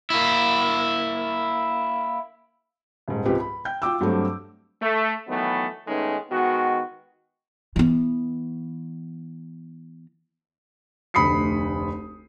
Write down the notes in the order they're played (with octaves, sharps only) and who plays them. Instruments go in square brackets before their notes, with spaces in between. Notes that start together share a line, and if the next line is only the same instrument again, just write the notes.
[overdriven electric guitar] A#3 E4
[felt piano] D#1 G#2
C#2 C3 F3 G4 B4
B5
G5 G6
F4 G5 D6 E6
G2 F#3 A3 C4
[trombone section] A3
D#3 E3 F#3 A3 B3
D#3 G#3 A3 B3 C#4 D#4
D#3 G#3 B3 F#4
[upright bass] E3 B3
[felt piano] F1 D2 B5 D#6 C7 C#7